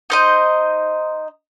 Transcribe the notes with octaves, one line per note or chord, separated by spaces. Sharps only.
D#4 C5 D#5